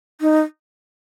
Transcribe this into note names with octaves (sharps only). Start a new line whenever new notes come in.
D#4